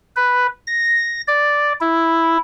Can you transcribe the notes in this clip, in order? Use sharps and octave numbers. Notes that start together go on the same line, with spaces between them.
B4
A#6
D5
E4